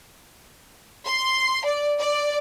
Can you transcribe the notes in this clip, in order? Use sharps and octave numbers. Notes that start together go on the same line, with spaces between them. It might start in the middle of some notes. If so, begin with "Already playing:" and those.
C6
D5
D5